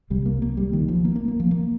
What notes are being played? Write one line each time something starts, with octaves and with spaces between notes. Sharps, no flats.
C2 C3 G3
A#3
A#3
G3
D#3
F3
A#3
A#3
A#3
F3
A#3